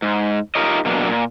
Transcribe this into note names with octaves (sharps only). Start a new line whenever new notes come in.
G#2
D#4 F4 G4 A#4 C#5 D#5
B2 F#3 A#3 D4
A#2